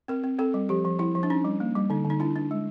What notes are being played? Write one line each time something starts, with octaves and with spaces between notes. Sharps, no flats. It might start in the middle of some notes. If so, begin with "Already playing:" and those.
C4 A#4
C4
C4 A4
G3
F3 G4
F3
F3 E4
F3
D4
C#4 D#4
G3
A#3
G3
D3 D#4
D3
D#4
D4 E4
D4
G#3